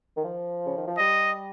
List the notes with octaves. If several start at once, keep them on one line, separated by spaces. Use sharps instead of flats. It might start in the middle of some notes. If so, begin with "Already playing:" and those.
D#3
F3
C#3
D#3
F3
G3 D#5